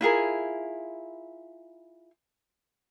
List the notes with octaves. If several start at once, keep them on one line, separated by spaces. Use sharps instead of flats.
E4 F4 G#4 A#4